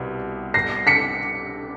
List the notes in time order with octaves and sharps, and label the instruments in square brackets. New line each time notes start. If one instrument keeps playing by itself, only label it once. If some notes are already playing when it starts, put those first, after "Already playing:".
Already playing: [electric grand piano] C2 B2 G3
[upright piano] A#6 C7
B6 C#7